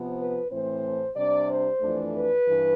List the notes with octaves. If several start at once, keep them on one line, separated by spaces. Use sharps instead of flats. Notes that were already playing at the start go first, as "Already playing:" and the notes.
Already playing: C3 F3 B3
B4
A2 E3 A3 C4 C5
C3 G3 D4 D5
C5
F2 E3 A3 D4
B4
G2 E3